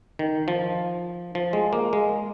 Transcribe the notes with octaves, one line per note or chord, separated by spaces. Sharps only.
D#3
F3
F3
G#3
A#3
G#3